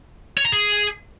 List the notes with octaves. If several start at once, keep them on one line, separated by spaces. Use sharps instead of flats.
C#5
A#5
G#4